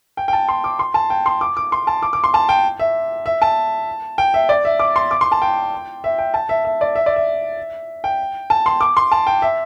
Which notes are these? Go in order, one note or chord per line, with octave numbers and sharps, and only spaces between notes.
G5
G5
A5
C6
D6
C6
A5
G5
C6
D6
D6
C6
A5
D6
D6
C6
A5
G5
E5
E5
A5
G5
E5
D5
E5
D6
C6
D6
C6
A5
G5
E5
G5
A5
E5
E5
D5
E5
D5
E5
G5
A5
C6
D6
C6
A5
G5
E5